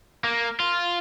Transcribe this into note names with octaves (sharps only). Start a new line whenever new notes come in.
A#3
F4